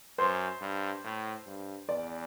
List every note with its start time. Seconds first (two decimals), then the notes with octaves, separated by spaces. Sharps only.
0.18 F#2 C5
0.61 G2
1.04 A2
1.46 G2
1.89 E2 D5